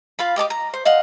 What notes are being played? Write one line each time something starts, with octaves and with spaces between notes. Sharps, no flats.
F4 F5 B5
G4 D#5 A5 D6
A#5
C5
D#5 F5 F#5